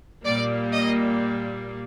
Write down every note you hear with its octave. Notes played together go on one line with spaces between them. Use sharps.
A#2 G3 A#3 D5
D#5